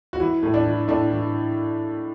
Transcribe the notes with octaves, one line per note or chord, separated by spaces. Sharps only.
F#4
E3 E4
A2
D4
E3
A2 D4
E3